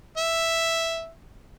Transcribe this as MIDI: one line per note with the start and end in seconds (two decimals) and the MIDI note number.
0.17 1.10 76